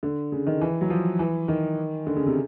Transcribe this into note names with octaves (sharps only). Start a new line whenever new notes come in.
D3
C#3
D#3
E3
F#3
F3
E3
D#3
D3
C#3
C3